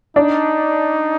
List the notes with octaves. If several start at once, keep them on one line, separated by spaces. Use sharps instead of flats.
D4 D#4